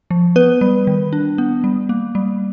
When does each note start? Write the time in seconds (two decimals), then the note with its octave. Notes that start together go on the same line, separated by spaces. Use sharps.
0.11 F3
0.36 B3 B4
0.61 G3
0.87 D#3
1.13 D4
1.38 B3
1.64 G3
1.89 A#3
2.15 G3